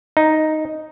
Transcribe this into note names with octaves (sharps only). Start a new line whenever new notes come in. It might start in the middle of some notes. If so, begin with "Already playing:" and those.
D#4